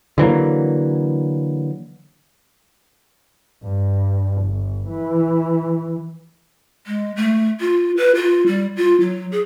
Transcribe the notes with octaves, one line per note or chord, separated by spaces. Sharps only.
D3 E3 F#3 A#3
G2
G1
E3
G#3
A3
F4
B4
F4
G3
F4
F#3
G#4